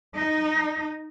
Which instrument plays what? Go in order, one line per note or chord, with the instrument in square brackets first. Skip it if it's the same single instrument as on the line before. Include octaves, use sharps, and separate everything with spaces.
[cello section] D#4